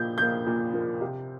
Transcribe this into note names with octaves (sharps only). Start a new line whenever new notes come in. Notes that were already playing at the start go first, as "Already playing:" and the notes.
Already playing: A#2 F3 A#3 G6
F3 A#3 G6
A#2
F3 A#3
C3